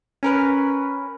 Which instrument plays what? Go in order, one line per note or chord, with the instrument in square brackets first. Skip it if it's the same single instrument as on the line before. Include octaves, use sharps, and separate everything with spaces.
[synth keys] C#4 A#4 B4